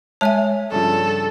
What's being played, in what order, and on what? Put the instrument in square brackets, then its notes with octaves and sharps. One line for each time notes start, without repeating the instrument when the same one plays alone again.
[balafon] G#3 A5 [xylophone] C#5 E5 G#5
[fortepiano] G2 C#3 F3 [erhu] A4